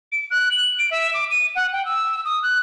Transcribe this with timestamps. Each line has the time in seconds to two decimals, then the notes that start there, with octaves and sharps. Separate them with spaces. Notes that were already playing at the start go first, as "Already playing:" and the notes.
0.12 D7
0.30 F#6
0.51 F#7
0.79 D7
0.91 E5
1.14 D6
1.31 D#7
1.55 F#5
1.72 G5
1.85 E6
2.25 D#6
2.43 F#6